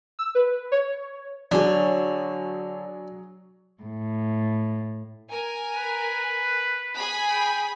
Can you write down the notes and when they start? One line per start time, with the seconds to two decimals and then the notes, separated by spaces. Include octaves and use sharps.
0.19 E6
0.35 B4
0.72 C#5
1.51 D3 F#3 D4 G#4 C#5
3.84 A2
5.29 A#4 G#5
5.76 B4
6.96 B3 G#4 G#5 B5
7.30 G5